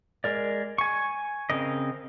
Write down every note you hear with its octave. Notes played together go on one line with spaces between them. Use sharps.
G#3 A#4 D5
G#5 C#6
C#3 C4 A#4 D#5